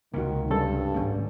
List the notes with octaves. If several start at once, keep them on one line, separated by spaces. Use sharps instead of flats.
C#2 C3 D#3 A#3 F#4
G2 G3 C#4 A4
G#1 A3 C#4 G#4